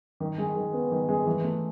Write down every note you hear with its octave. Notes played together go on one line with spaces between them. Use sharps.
D#3
G#3
D#3
B3
D#3
G#3
E3
A3